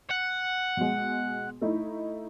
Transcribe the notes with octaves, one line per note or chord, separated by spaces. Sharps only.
F#5
B2 G#3
A3 D#4 E4